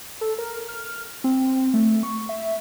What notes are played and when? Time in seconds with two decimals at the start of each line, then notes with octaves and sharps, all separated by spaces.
0.21 A4
0.38 A#4
0.68 F6
1.24 C4
1.74 A3
2.03 C#6
2.29 E5